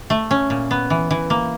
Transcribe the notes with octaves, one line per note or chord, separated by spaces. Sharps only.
A3
C#4
A#2
B3
E3
E3
A#3